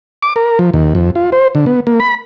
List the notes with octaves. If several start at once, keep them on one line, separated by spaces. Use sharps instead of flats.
D6
A#4
F3
D#2
F2
F4
C5
D3
B3
A#3
B5